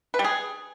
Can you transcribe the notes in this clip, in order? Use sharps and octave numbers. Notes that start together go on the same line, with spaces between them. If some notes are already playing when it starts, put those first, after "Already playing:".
B4
G3
G#4